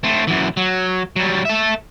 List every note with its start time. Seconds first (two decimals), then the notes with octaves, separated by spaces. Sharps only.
0.04 A3 C4
0.28 F#2 E3
0.57 F#3
1.16 F#3 G3
1.45 A4 E5